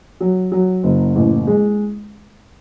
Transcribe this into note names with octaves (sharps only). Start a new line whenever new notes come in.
F#3
F#3
F#1
A1
G#3